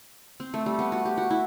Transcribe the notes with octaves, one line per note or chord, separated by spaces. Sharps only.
C4
A3
G3
B3
F#4
G4
F#4
E4